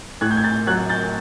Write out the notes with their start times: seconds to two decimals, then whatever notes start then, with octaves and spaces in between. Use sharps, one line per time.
0.21 A2 F#6 G#6
0.31 G6
0.37 G#6
0.44 G6 A6
0.67 F#3 F#6 G#6
0.89 G6 A6